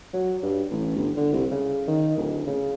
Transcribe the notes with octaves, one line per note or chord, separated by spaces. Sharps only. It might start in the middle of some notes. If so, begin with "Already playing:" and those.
F#3
G2
A1
G1
D3
C2
C#3
D#3
D1
C#3